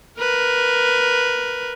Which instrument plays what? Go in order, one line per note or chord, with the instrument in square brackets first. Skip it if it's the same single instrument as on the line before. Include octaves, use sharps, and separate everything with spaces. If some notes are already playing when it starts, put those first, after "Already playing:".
[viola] A#4 B4